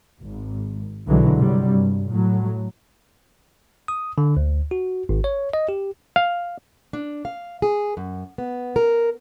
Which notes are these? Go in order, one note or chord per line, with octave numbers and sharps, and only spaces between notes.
G#1
B1 D3 E3 F#3 G#3
G2 C3 F#3 G3
G2
A2 F#3
D#6
D3
D2
F#4
G#1
C#5
D#5
G4
F5
D4
F5
G#4
F#2
B3
A#4